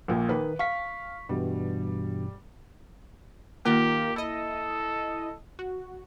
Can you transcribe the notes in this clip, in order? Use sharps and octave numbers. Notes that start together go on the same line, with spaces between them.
A#1 A#2
D#3 B4
F5 C#6 B6
G2 B2 E3 G3
D#3 A#3 F4 G4 A#4
E4 A4 D#5
F#4